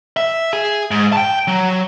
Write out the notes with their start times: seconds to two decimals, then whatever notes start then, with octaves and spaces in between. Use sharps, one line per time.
0.17 E5
0.53 G#4
0.91 G#2
1.13 G5 A5
1.48 F#3